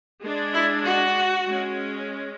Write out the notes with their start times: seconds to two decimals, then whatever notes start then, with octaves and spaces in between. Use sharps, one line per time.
0.22 G#3 D4
0.54 E4
0.84 F#4
1.46 G#3 C#4